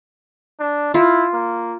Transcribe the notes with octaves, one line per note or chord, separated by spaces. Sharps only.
D4
E4 F4
A#3